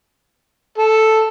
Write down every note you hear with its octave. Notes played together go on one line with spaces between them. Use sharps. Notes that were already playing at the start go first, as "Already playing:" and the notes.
A4